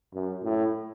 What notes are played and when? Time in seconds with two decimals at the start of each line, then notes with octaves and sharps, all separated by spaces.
0.14 F#2
0.43 A2